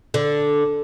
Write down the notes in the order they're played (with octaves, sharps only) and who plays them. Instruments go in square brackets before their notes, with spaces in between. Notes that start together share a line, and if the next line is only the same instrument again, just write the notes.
[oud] D3